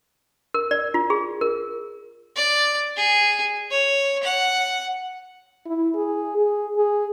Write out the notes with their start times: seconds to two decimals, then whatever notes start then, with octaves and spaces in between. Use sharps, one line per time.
0.54 A#4
0.71 D5
0.94 F4
1.10 G#4
1.41 A#4
2.36 D5
2.96 G#4
3.70 C#5
4.23 F#5
5.66 E4
5.95 G#4
6.37 G#4
6.76 G#4